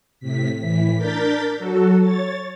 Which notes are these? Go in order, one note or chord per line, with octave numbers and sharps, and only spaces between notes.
A2 C3 B6
A2 E3 B6
D4 A#4 G6 A6 B6
F#3 F#4 A4
C#5 A6